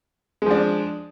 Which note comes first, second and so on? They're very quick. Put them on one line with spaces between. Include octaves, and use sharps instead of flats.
G#3 F3 D4